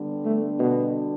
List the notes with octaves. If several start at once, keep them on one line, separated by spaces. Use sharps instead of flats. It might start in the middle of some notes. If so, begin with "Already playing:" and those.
Already playing: D3 G3 B3 D4
A3
B2